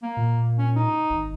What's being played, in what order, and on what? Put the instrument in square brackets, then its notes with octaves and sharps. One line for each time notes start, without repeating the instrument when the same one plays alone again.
[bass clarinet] A#3
[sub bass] A#2
[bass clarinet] C#4
D#4
[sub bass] G#1